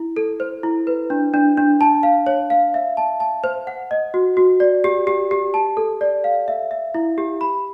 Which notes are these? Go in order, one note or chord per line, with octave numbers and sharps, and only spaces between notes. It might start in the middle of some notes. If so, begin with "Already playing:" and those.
Already playing: E4
A4
C5
E4
B4
D4
D4
D4
A5
F5
C#5
F5
E5
A5
A5
C5
F#5
D#5
F#4
F#4
D5
G4
G4
G4
A5
A4
D5
F5
E5
E5
E4
G4
B5